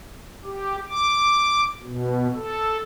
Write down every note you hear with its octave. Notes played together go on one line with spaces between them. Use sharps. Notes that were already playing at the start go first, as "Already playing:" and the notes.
G4
D6
B2
A4